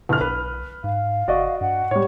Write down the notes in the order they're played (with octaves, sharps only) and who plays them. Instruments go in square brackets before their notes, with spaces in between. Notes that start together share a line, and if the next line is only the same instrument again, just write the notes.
[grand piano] G1 F6 [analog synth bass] E4
[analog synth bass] B1 [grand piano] B4
[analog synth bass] G#2 [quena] F5
[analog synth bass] F#1 [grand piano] F#4 D5 D#5
[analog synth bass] G2 [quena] F#5
[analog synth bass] A2 [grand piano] G3 C#5